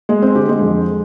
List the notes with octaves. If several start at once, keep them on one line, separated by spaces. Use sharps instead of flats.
G#3 G#4
C4 C5
D3 G4
G#3 G#4
F2